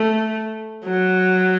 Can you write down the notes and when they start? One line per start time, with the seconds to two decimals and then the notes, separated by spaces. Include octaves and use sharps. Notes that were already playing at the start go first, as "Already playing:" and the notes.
Already playing: A3
0.86 F#3